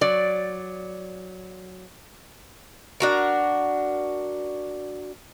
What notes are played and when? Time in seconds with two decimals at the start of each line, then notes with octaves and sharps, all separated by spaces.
0.01 F#3 D5
3.00 D4 F#4 A#4